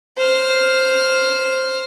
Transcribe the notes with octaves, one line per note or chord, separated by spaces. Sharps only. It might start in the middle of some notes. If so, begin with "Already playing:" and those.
C5 F6